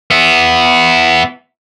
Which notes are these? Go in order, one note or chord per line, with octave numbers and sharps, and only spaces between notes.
B3 E4